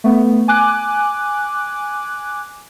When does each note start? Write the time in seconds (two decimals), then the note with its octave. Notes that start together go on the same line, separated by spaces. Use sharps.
0.04 A3 B3
0.48 G#5 D6 F#6